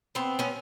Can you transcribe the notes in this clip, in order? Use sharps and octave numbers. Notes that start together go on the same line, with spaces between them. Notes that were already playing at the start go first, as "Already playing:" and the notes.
B3 C4
B3 C#4